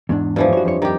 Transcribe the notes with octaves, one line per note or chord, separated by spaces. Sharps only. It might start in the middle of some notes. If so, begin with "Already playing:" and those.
E2 G#2 D4
G2 E3 F3
F#4 C#5
F2 C5 C#5
F2 D#3 G3 G4